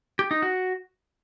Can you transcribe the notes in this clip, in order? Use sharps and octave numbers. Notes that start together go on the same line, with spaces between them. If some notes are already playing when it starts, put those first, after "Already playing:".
G4
D#4
F#4